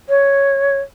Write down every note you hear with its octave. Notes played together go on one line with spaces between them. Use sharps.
C#5